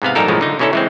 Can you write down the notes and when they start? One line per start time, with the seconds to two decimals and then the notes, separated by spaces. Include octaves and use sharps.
0.02 G#2 C3 B3 F5
0.15 A#1 G#2 G3 D#4 A4 A#4
0.28 B1 A2 C#3 F3 G#3
0.41 D3 D#4
0.59 B2 D3 C#4 E4 A4
0.73 E3 G#3 C4